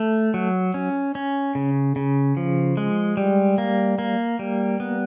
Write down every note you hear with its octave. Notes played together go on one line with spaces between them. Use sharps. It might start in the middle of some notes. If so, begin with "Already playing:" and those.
Already playing: A3
F#3
C#4
C#4
C#3
C#3
F3
G#3
G3
A#3
A#3
G3
B3